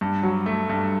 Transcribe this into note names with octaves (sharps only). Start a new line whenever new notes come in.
G2
F#3
A3
G2